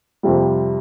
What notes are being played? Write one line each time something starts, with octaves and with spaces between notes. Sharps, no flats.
F2 C3 G3